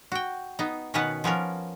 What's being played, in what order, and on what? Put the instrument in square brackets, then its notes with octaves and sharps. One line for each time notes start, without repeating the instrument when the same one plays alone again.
[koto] F#4 G5
B3 D#4
B2 D#3 B3 C#4 B4 F#5
F3 B3 C#4 A#4